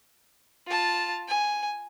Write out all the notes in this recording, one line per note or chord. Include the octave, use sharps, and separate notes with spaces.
F4 A5
G#5